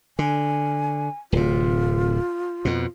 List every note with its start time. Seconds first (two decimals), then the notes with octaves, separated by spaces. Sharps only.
0.19 D3 G#5
1.32 D1 C3 F4
2.65 F2 B2